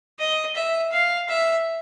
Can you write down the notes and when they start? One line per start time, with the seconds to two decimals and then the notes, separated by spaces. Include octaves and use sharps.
0.19 D#5
0.56 E5
0.92 F5
1.29 E5